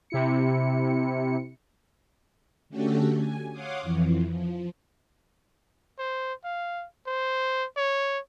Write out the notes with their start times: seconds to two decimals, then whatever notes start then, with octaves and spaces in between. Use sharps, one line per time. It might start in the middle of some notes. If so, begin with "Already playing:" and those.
0.10 C3 E4 C#7
2.70 D3 A3 C#4 F#4 G4 A4
3.16 G#5
3.52 C#5 F5 F#5 C6 D6 D#6
3.82 F2 E3
4.28 F3
5.99 C5
6.44 F5
7.07 C5
7.77 C#5